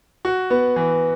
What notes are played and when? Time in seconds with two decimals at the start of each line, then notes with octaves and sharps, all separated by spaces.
0.25 F#4
0.50 B3
0.76 E3